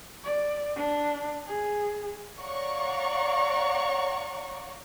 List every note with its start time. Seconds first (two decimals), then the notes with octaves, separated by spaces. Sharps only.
0.25 D5
0.76 D4
1.47 G#4
2.41 C#5 D5 F5 F#5 A#5 C#6